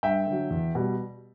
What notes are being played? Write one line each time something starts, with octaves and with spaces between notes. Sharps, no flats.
G2 E5 G5
D3
F#3
E2
B2 G3